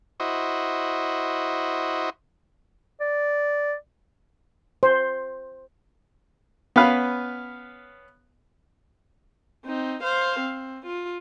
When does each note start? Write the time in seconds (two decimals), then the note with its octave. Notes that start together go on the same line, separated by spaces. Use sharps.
0.20 E4 F#4 C5 D#5
3.01 D5
4.83 C5
6.76 B3 C#4 B4 F5
9.66 C4 D#4
10.03 C5 F5
10.40 C4
10.86 F4